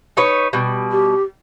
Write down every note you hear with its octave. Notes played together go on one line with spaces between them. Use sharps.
D#4 B4 C#5
B2 G3
G4